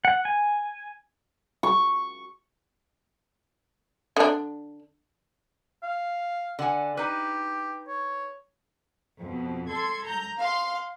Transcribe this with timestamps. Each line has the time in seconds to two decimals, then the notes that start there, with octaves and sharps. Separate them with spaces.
0.05 F#5
0.25 G#5
1.63 C#6
4.16 D3 D4
5.83 F5
6.59 D3 F#5 G#5
6.97 D#4 G4 B4
7.88 C#5
9.18 F2 B2
9.70 A4 C6 G#6
10.06 A#5 G6
10.40 F5 C6